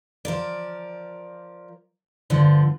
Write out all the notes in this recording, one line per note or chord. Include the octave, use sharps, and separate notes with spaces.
F3 A#4 D5
G2 D3 F3